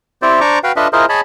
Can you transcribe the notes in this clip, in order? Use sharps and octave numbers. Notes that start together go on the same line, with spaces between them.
C4 E4 G4 C5 D5
D4 C5 D5 A#5 C#6 D6
F#4 B4 F5 G5
D4 F4 A4 B4 D#5 E5
E4 F4 G#4 A#4 C5 D#5
G#4 C#5 D#5 A5 B5